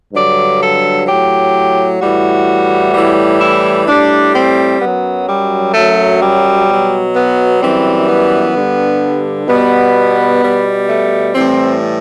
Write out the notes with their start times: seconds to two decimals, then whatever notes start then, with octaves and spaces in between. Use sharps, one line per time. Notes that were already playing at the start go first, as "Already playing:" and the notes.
0.14 G2 D3 F#3 D5
0.60 A4
1.07 A2 F#3 G4
2.01 A2 E3 G3 F#4
2.94 A2 E3 G3
3.41 E4
3.87 A2 G3 D4
4.34 C4
4.81 F#2 F#3 B3
5.27 G3
5.74 F#2 F#3 A3
6.21 G3
6.68 B2 F#3
7.15 B3
7.61 F#2 E3 G3 C4
8.07 B3
8.55 G2 D3 G3
9.48 B2 G3 B3
10.42 B2 G3
10.87 A3
11.35 A2 E3 G3 C4